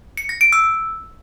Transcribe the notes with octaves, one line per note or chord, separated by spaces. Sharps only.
C#7
A#6
D7
E6